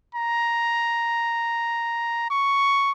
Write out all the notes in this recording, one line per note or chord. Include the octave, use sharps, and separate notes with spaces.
A#5
C#6